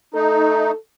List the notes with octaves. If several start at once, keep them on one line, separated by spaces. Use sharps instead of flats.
A3 D#4 A4